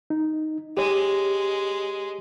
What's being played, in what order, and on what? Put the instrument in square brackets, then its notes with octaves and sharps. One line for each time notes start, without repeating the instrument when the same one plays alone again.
[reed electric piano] D#4
[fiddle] G#3 [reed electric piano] G4 C#5